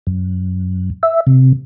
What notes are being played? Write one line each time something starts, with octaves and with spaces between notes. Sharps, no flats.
F#2
E5
C3